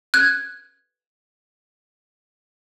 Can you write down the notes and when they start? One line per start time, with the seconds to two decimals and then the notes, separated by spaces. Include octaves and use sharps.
0.14 F#6 G#6